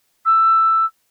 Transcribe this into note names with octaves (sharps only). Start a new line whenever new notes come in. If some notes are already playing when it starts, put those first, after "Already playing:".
E6